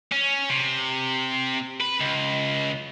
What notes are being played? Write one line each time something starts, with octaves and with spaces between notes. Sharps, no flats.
C#4
C3
B4
C#2